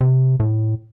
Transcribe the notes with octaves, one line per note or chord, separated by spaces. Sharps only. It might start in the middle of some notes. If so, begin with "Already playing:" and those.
C3
A2